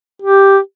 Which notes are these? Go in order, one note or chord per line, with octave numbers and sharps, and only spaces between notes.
G4